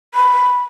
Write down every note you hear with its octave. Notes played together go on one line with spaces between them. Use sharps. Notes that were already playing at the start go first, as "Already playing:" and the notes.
B5